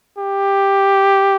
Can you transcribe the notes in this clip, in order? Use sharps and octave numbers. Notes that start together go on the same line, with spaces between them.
G4